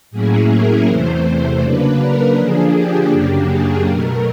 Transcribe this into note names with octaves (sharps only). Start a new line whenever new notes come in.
A2 F#3 A#3 C#4 E4 G#4
A#4
E2 C3 E3 A3 C5
C5
C#3 F#3 A#3 D4 B4
A#4
D3 F3 A#3 D4 G#4
G4
F#2 C#3 F#3 A#3 D4 G4
G#4
B2 F#3 A3 A#4